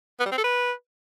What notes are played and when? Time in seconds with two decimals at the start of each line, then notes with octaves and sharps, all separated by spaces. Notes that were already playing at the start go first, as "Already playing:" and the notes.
0.20 B3
0.26 G3
0.32 C4
0.38 A4
0.44 B4